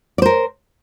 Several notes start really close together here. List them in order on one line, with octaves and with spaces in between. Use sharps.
D5 C5 A#4